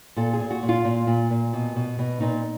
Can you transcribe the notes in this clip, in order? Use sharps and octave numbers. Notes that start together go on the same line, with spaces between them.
A#2 A4
G#4
A#2
F#4
A#2
F4
A#2
A#2
A#2
B2
B2
B2
A#2 D#4